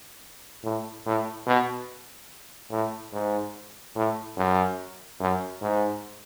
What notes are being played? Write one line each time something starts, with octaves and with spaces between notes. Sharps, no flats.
A2
A2
B2
A2
G#2
A2
F#2
F#2
G#2